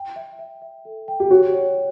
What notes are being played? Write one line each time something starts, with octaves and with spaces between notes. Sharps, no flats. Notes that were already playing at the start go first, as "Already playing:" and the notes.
Already playing: G5
E5
E5
E5
A4
G5
G4
F#4 C#5
C#5